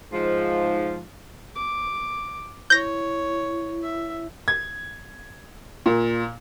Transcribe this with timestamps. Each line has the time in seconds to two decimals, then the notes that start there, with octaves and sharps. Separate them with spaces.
0.13 G#2 F3
1.55 D6
2.70 E4 C#5 G6 A#6
3.83 E5
4.48 G#6
5.86 A#2